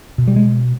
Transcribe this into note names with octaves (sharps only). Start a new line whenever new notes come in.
B2
G3
G#3